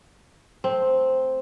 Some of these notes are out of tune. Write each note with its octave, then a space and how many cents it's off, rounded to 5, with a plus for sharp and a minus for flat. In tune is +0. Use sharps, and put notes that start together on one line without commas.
A3 -5 C4 +0